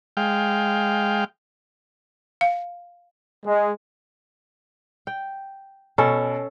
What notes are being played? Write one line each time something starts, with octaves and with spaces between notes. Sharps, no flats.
G#3 F5 G5
F5
G#3
G5
B2 C#4 A4